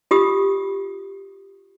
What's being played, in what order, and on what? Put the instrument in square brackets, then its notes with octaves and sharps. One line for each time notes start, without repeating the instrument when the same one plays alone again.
[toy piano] F4 G4 D#6